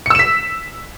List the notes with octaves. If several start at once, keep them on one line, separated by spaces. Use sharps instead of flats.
E6 B6 C#7 E7